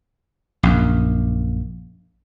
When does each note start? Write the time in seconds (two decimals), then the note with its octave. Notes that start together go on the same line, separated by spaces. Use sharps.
0.63 A#1 F#2